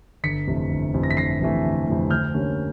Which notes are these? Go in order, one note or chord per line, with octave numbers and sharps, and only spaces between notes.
G1 B6 C#7
F2 C3 E3 A3
G1
F2 C3 E3 A3
A#6
B6
G1 A#6 C7
F2 C3 E3 A3
G1
F2 C3 E3 A3
D2 F6 G6
D3 G3 A#3 C#4